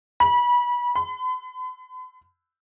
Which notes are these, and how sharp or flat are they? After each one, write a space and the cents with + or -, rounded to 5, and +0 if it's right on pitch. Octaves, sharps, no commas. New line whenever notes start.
B5 -25
B5 +45